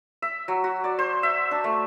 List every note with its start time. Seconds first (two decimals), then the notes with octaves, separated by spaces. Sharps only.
0.22 E5
0.48 F#3
0.64 F#4
0.84 D5
0.99 C5
1.23 E5
1.51 D4
1.64 A3